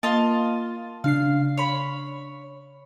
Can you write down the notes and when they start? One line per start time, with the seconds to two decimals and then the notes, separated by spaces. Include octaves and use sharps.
0.03 A#3 F4 D#5 A5
1.04 C#3 D4 F5 C7
1.58 C#5 B5